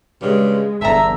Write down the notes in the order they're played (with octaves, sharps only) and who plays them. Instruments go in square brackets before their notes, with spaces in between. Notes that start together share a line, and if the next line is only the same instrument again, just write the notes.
[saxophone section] G2 C#3 [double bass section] G#3
[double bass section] G1 E2 D3 [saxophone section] E5 [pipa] A5 A#5